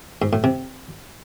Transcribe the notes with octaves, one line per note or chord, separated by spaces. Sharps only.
G#2
A2
C3